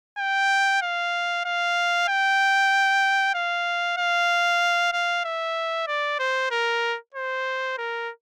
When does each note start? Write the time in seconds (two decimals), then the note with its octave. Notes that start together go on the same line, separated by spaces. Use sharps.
0.18 G5
0.81 F5
1.45 F5
2.08 G5
3.34 F5
3.97 F5
4.93 F5
5.25 E5
5.87 D5
6.19 C5
6.51 A#4
7.14 C5
7.77 A#4